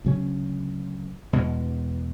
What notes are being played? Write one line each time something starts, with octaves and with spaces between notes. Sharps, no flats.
D2 C#3 F#3 C#4
E2 B2 G#3